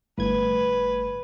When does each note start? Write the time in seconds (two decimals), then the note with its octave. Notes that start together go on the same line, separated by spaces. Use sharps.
0.18 G1 A2 B4 G#6